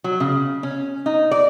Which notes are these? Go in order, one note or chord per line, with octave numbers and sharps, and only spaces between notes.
F#3
C#3
C#4
D#4
D5